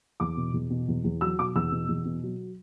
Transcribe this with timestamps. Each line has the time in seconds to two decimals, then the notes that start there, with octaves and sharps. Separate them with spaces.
0.20 E2 D6
0.37 B2
0.54 E2
0.70 B2
0.88 E2
1.04 E2
1.21 F#3 E6
1.39 B2 D6
1.55 E2 E6
1.72 B2
1.89 E2
2.05 B2
2.23 F#3